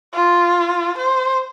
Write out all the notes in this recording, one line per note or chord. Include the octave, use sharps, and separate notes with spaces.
F4
C5